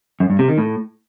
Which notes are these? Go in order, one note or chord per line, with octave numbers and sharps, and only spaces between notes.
F#2
G2
C3
D#3
A2